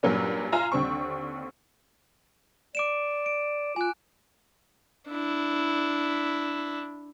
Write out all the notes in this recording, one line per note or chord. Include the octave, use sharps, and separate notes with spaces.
G2 A#2 F#3 A#3 C#4
F4 G#5 A#5 E7
D#2 D3 C4 C#6
D5 D6 D7 E7
D7
F4 G#5 F#6
D4 E4